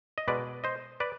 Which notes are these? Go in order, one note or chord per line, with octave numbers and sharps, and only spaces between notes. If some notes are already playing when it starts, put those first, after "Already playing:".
D#5
B2 G#3 B4 D5
C5 D#5
B4 D5